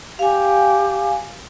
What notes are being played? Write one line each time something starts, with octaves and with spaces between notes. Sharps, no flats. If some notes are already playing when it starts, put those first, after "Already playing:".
G4 F5 G#5